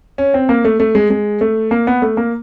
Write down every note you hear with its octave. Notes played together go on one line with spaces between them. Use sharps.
C#4
C4
A#3
A3
A3
G#3
G#3
A3
A#3
B3
A3
A#3